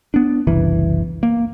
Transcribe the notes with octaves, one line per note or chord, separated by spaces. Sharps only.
B3 D4
F#1 C2 E3
A#3